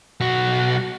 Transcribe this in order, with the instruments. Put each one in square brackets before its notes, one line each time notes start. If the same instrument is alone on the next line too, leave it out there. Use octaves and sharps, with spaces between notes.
[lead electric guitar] B1 F#4